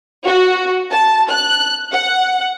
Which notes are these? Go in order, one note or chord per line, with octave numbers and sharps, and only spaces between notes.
F#4
A5
F#6
F#5